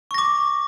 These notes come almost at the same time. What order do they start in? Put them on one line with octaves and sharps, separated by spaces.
C#6 A#6 D6